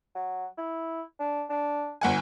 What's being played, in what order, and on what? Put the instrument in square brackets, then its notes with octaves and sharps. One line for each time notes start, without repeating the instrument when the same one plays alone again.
[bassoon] F#3
E4
D4
D4
[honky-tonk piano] G1 F#5 G#5